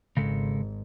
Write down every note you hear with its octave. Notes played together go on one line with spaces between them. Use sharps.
G#1 C#3 G#3 A4